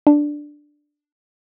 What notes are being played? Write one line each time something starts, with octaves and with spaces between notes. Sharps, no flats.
D4